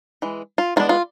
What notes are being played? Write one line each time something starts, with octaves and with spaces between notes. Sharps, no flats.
E3 G#3
F4
E3 G#3 B3 D4 F4
F4